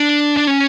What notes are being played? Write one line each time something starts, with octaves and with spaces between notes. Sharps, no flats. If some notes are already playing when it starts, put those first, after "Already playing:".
Already playing: D4
D4
C#4